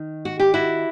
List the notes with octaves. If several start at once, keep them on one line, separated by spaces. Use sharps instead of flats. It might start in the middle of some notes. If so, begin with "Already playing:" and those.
Already playing: D#3
F#4
G4
E4 F#4